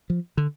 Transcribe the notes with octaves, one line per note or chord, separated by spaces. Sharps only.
F3
D3